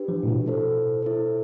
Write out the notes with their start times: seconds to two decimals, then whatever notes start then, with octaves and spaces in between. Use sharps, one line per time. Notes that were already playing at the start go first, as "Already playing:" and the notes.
Already playing: D4 G4 B4
0.08 F3
0.23 A2
0.28 B2
0.46 E4 A4 C5
1.02 E4 A4 C5